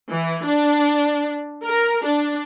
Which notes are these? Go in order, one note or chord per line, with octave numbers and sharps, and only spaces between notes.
E3
D4
A#4
D4